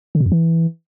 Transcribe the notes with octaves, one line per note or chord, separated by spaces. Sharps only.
D3
B2
F2
E3